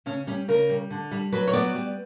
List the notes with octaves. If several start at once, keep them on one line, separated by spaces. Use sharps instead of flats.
C#3 C#4
G3 C#4
C#3 A#4
G3
D3
G3
F#3 B4
C#5
B3 D5
G3